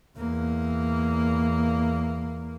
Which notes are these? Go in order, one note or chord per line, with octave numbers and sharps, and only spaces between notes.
E2 A#3